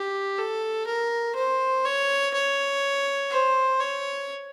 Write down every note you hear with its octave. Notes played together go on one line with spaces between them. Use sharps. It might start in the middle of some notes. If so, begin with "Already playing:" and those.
Already playing: G4
A4
A#4
C5
C#5
C#5
C5
C#5